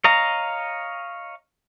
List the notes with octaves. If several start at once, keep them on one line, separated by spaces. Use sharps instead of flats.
C#5 D#5 F5 A#5